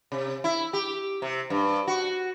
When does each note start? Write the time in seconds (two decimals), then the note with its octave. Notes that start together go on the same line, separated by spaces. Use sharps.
0.12 C3
0.44 E4
0.73 G4
1.22 C3
1.50 G2
1.87 F#4